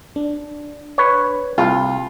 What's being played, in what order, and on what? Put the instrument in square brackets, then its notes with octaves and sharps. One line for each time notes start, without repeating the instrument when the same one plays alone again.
[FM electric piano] D4
[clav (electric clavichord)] B4 C#5
[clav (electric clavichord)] C2 [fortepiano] F4